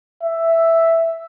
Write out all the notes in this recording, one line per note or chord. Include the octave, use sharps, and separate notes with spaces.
E5